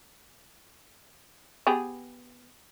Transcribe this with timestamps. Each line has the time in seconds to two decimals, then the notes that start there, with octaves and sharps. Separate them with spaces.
1.67 B3 G4 G#4